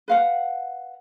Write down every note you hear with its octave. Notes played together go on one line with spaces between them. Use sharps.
B4 F5 F#5